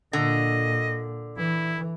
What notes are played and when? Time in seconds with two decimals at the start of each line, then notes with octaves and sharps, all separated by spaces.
0.13 A#2 D3 D#5
1.37 E3 E4